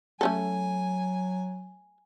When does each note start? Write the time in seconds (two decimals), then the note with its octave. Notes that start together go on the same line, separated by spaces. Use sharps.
0.21 F#3 A3 C#4 A4 G#5